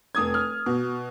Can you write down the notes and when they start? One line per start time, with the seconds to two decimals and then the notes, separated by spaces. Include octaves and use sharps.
0.15 F1 D#6 G#6
0.34 F6
0.66 B2